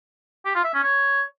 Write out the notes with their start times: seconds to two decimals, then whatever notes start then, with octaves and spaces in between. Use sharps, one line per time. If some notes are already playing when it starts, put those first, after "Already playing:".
0.45 G4
0.55 F4
0.64 E5
0.74 C#4
0.83 C#5